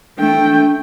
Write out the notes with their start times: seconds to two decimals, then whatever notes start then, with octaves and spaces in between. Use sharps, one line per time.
0.19 A3 D4 G5